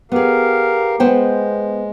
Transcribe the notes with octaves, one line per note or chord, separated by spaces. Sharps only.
B3 G4 G#4 A#4 F5
G#3 B3 C5 G5